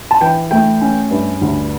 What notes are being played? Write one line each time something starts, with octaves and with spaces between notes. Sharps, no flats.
A5
E3 G5
A3 G5
C#4
G2
D2